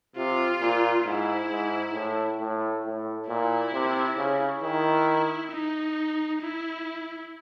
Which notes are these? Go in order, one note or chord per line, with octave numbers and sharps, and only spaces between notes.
C3 F4
A#2
G#2 E4
G#2
A2
A2
A2
A#2 E4
C3
C#3
D#3 E4
D#4
E4